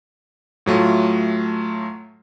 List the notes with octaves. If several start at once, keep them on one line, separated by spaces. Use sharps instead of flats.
A2 F#3 A3 F4